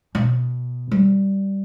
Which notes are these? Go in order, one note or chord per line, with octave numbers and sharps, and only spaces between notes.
B2
G3